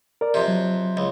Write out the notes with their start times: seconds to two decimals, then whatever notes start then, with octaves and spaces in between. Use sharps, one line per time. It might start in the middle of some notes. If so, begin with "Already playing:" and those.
0.21 A#4 D5
0.34 F2 C3
0.48 F#3
0.97 C#2